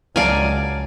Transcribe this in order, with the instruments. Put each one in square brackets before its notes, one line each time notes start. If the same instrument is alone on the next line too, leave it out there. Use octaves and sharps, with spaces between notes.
[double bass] C#2 [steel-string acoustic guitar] F#3 [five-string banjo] A#4 F5 A5 [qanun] D5 G#5